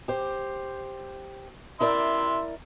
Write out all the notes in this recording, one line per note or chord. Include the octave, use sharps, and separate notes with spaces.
G4 C5
E4 A#4 D5 E5 C6